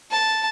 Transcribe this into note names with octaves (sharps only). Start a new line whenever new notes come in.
A5